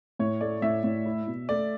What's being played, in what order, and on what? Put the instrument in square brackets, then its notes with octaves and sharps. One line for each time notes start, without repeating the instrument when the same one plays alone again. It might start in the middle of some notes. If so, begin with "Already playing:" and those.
[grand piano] A2 [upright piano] C#5
[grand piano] A3 [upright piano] D5
[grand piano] A2 [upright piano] E5
[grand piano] A2
E4
B2
[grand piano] A3 [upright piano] D5